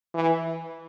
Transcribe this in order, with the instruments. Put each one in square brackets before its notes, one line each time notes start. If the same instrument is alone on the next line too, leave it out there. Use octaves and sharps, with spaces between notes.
[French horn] E3